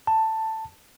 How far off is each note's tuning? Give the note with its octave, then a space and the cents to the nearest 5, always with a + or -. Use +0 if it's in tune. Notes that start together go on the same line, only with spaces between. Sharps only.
A5 +10